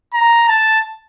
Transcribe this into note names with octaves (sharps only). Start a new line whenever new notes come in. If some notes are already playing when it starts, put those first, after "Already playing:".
A#5
A5